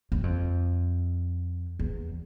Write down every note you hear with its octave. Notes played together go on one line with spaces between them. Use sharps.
F#2
F2
E2